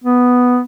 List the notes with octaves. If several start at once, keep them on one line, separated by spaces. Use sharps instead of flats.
B3